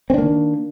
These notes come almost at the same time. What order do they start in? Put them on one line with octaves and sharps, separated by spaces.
C4 D4 A#3 D#3